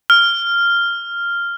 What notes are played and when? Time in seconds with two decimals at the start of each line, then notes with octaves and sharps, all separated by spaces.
0.10 F6